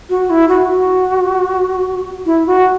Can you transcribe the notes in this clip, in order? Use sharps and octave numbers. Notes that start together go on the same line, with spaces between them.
F#4
E4
F#4
F#4
E4
F#4